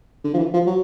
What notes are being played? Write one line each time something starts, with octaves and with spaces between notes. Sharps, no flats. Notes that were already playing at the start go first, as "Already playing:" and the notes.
D3
F3
E3
F3
F#3